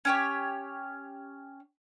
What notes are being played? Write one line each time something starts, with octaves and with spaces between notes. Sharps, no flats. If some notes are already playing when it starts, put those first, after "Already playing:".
C#4 G4 C#5